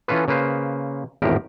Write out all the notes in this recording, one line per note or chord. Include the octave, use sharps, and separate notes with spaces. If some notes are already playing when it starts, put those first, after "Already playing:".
E3 C#4 F4 A4 B4
C#3 A#3 B4 C5
G#1 E2 A2 G4 A#4